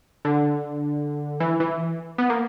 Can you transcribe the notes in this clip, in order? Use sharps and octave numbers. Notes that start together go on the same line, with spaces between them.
D3
E3
E3
B3
A#3